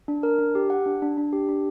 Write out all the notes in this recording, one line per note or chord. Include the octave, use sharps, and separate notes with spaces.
D4
A#4
D4
G4
F#5
D4
D4
D4
G4
D4